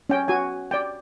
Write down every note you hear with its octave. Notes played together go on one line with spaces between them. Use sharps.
C#4 G5
F#4 G#5
D5 G5